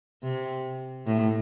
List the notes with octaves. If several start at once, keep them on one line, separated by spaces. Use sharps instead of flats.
C3
A2